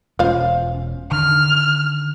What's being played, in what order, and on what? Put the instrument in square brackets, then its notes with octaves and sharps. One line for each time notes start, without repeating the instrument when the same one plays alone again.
[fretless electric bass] E1 C4 C#4 [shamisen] F4 C5 F5
[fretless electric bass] D3 D#3 [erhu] F6